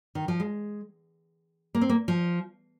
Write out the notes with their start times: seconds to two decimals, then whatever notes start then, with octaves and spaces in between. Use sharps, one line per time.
0.15 D#3
0.28 F3
0.40 G#3
1.75 A#3
1.81 C4
1.89 A#3
2.08 F3